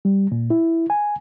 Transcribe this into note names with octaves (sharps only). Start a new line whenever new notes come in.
G3
A#2
E4
G#5